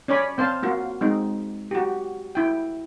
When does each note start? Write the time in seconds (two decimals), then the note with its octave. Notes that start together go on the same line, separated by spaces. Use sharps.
0.08 C#4 C#5 D5 G#5 B5
0.38 C4 C5 F5 A5
0.63 A#3 F4 F#4
1.01 G#3 C4 D#4
1.71 F#4 G4
2.35 E4 G5